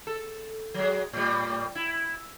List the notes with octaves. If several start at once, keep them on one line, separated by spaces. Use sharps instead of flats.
A4
F#3 G#3
A2 G3
E4